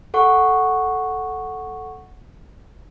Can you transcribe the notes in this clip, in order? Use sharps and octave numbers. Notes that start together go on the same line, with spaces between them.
A4 F#5 C#6